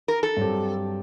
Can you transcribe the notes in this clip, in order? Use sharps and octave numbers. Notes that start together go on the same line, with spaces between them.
A#4
A4
G2 F#3 C4 G4